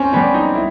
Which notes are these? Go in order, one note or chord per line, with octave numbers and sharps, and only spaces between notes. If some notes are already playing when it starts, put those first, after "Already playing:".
Already playing: C4 C#4
G3 B3 C#4
D#4
E4